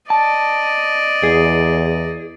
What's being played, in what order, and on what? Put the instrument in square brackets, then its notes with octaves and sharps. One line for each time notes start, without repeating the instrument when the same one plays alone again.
[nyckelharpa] D5 D#5 [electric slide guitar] A5
[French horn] E2 [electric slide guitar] G#4